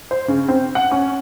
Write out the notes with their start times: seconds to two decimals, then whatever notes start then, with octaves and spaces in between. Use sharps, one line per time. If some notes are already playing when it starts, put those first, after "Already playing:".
0.11 C5
0.28 C#3
0.48 C4
0.75 F#5
0.91 C#4